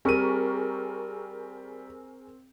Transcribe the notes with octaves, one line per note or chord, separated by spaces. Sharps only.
G3 C4 G#4 A#4 C#6 D#7